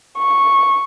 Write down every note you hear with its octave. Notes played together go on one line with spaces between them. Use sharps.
C#6